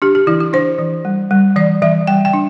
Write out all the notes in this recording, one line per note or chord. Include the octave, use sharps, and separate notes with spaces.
D4 G4
G4
E3 E4
E4
D4 C5
E3
G3
G3
E3 D5
E3 E5
G3 G5
G5
D4